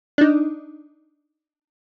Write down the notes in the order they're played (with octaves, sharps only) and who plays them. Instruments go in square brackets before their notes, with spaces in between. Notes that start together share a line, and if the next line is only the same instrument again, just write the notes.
[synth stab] D4 D#4